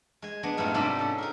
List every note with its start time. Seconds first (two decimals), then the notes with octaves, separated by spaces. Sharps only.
0.22 G#3 G#5
0.43 G#3 B3 D4 D#5
0.57 F#2 A2 G3 B3 D#4 F4
0.74 G#2 C3 G3 D4 D5 B5
0.99 C#4 A4
1.18 D#4 G#4 A#4